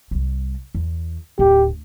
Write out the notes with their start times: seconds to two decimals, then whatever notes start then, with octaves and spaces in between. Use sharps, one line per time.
0.11 C2 G3
0.75 E2
1.39 D1 G4